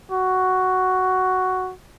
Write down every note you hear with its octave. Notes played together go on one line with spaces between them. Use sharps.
F#4